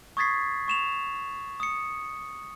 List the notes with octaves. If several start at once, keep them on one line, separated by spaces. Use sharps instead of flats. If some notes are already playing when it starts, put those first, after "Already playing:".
C#6 D#6 G#6 A6 B6 C7
C#6 E7 F7
D#6 C#7